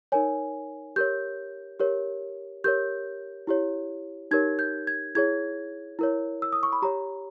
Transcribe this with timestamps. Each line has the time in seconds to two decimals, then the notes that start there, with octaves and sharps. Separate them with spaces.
0.12 D#4 A#4 C#5 G#5
0.96 G4 A#4 C#5 G6
1.79 G4 A#4 C#5
2.64 G4 A#4 C#5 G6
3.47 E4 G4 C#5
4.31 D#4 G4 A#4 C#5 G#6
4.59 G6
4.87 G#6
5.15 E4 G#4 C#5 G#6
5.99 E4 A#4 C#5
6.42 E6
6.53 D#6
6.63 C#6
6.72 B5
6.82 G4 C#5 A#5